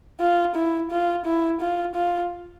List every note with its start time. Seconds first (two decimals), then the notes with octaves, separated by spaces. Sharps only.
0.20 F4
0.55 E4
0.91 F4
1.25 E4
1.61 F4
1.95 F4